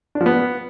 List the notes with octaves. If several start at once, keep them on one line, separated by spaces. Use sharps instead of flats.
D4
F3
B3